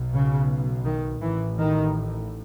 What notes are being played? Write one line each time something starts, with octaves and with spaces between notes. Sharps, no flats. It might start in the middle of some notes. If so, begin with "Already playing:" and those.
Already playing: B1 B2
C#3
D#3
A1 A2 E3
D#3